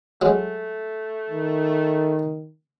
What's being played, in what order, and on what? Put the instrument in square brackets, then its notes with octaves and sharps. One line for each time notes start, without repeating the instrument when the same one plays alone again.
[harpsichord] F#3 G#3 [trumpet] A3
[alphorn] D#3